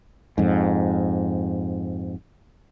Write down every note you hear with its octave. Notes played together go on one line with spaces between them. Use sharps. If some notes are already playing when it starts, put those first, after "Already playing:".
F2 G#2